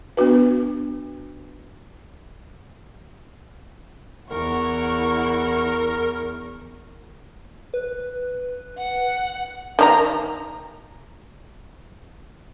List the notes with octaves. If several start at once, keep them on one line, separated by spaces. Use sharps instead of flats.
B3 D4 F#4 B4
E2 E4 A#4 F#5 C#6
B4
F#5
D#3 D#4 A#5